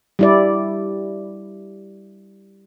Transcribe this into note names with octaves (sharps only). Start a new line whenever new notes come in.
G3 E4 D5